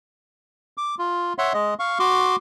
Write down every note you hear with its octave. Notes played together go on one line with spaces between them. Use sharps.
D6
F4
C#5 E5 F#5 C6
G#3 D#5
F5 C#6
F#4 C6 D6